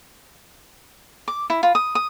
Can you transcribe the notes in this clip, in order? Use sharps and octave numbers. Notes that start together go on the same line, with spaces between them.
D6
E4
F4
D#6
D#6